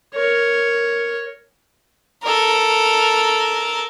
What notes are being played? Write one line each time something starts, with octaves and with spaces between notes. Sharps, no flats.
A#4 C#5
A4 A#4